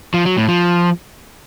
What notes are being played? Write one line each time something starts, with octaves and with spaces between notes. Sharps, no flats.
F3
F#3
A2
F3